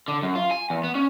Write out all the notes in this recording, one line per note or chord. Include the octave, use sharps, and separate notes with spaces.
D3
F#2
F4
G#5
E2
B3
C#4